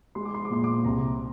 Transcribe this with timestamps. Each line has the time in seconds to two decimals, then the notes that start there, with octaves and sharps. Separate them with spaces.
0.15 G#3 C6
0.25 D6
0.34 C6
0.45 D6
0.51 A#2 C6
0.64 D6
0.74 C6
0.85 C2 A#5